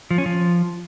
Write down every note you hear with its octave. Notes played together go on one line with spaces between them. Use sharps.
F3
C#4
F3